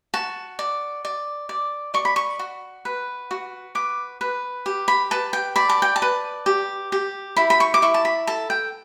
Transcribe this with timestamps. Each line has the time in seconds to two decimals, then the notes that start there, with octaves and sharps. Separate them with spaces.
0.14 F#4 A5
0.59 D5
1.05 D5
1.49 D5
1.94 D5 C#6
2.05 B5
2.16 C#6
2.39 F#4
2.85 B4
3.31 F#4
3.75 B4 D6
4.21 B4
4.66 G4
4.88 B5
5.11 B4 A5
5.33 G5
5.56 D5 B5
5.69 A5
5.82 G5
5.96 A5
6.02 B4
6.46 G4
6.92 G4
7.36 E4 B5
7.50 B5
7.60 C#6
7.74 D6
7.82 E4 C#6
7.94 A5
8.05 B5
8.27 A4 A5
8.50 G5